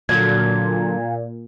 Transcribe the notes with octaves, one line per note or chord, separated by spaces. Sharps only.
A#2 D3 F#3 G#6